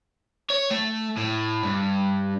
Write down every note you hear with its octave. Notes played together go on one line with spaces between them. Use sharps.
C#5
A3
A2
G2